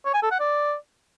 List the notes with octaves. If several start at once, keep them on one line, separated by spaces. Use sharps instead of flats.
C#5
G#5
A4
F#5
D5